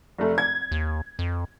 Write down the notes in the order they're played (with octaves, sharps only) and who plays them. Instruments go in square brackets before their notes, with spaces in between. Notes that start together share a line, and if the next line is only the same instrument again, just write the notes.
[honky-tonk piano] F1 A3
G#6
[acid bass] D#2
F2